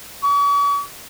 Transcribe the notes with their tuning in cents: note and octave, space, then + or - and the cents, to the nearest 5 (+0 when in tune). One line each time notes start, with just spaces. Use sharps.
C#6 +45